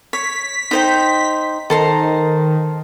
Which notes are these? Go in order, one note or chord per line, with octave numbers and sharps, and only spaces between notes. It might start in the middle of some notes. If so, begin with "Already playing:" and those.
C#5 B6
D#4 C5 G5
D#3 A4 C5 A#5